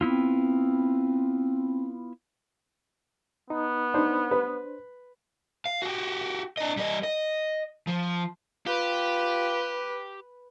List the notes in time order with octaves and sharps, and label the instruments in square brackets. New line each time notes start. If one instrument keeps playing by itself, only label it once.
[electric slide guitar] B3 E4 F4 [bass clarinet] C4
[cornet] B3 [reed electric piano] D#4
[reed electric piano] D4 C5 [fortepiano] D#4
[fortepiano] B4
[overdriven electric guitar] F5
F#4 G4
D4 D#5
G3 D#5
D#5
F3
[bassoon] F4 [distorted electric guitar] G4 [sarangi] B4